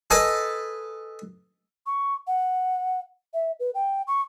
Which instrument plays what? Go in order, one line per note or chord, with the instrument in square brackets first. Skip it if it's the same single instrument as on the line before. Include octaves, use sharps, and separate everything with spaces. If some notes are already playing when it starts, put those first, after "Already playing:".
[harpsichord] A4 B4 D#5 G#5 A5 B5
[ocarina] C#6
F#5
E5
B4
G5
C#6